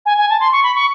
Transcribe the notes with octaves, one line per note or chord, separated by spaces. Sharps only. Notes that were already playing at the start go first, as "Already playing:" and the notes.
G#5
G#5
A5
C6
C#6
B5
C#6